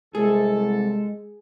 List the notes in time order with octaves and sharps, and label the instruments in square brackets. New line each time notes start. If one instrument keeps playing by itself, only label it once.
[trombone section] C2 [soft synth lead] G#3 [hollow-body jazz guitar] G#4 [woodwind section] A4